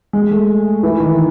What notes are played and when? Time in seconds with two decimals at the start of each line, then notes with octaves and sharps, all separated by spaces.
0.13 G#3
0.31 A3
0.83 E3
1.00 D#3